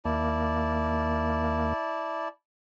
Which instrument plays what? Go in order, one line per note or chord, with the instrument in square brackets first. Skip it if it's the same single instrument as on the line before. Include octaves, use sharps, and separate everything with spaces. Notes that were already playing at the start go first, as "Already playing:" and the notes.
[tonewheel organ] D#2 A#3 [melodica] E4 D5 A5